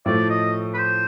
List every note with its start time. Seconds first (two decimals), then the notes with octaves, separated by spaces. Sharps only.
0.06 A2 F3 A3 D5
0.30 D#5
0.74 B4
0.78 C5